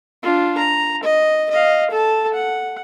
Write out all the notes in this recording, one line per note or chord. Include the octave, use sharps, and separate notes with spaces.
D4 F4
A#5
D#5
D#5 F5
A4 A5
F#5